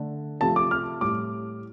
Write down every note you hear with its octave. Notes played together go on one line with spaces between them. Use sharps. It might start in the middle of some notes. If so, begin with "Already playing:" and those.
Already playing: D3 A3
C3 F3 A3 A5
D6
F6
A2 G3 D6